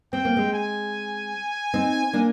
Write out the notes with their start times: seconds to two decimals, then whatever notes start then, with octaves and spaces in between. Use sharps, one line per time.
0.13 C4 G5
0.25 A#3
0.36 G#3 C4
0.53 G#5
1.74 C4 D#4
2.13 A#3 D4